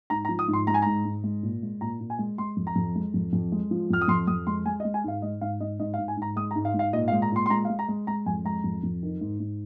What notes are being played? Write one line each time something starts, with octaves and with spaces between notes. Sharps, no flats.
G#2 A#5
A#5
F3
D#6
G#2
C6
G#3 A#5
G#5
G#2 A#5
G#2
G#3
A#2
G#3
A#2 A#5
A#2
G#5
G#3
G#3 C6
F2
A#5
F2
G#3
F2
F2
G#3
F3
F2 F6
D#6
F2 C6
F2 D#6
G#3 C6
G#3 G#5
D#5
G#3
G#5
G#2 F5
G#2 D#5
G#2 F5
G#2 D#5
G#2 D#5
F5
G#2
G#5
G#2 A#5
G#3 D#6
A#5
G#2
F5
G#2
F5
A#2 D#5
F5
G#3
A#5
A#2 C6
C6
G#3 A#5
F5
G#3
A#5
G#3
G#3 A#5
F2 G#5
G#3 A#5
F2
F2
D#3
G#2
G#2